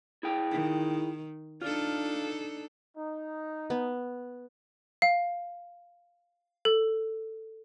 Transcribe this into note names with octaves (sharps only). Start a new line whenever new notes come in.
E4 G#4 G5
D#3
D4 D#4 F4 A4
D#4
B3
F5
A4